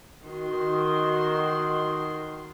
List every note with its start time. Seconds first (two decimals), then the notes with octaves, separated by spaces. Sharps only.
0.24 D#3 F#4 C6